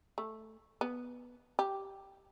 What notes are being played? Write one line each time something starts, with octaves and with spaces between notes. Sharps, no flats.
A3
B3
G4